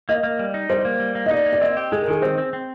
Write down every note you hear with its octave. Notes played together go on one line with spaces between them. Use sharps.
A#3 D#5
A#3
G3
D#4
G3 C5
A#3
G3
A#3
D#5
D#4 D5
A#3
D5
C4 D#5
G4
G#3 G#4
A#4
D#3 G#4
C4 C5
C4
C4